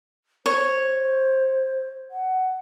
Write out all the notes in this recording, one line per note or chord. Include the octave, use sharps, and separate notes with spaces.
C5 C#5
F#5